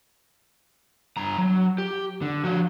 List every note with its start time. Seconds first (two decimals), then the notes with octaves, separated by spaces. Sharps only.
1.17 G2 A#5
1.38 F#3
1.78 G4
2.22 D3
2.45 F3 F#4